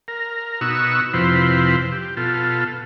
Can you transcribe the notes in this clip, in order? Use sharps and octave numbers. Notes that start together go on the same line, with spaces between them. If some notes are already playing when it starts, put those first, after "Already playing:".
A#4
B2 D#4 F#4 C#6 E6
F2 C3 F3 E4 B4 C5
G4
B2 F4 A4